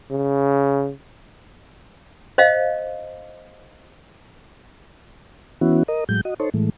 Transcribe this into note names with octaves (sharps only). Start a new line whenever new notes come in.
C#3
C5 D#5 F5
E3 B3 C#4 E4 F#4
A#4 D#5
A2 F#3 G#3 G6
F#4 D#5
D#4 A4 C5 C#5
A2 E3 G#3 A3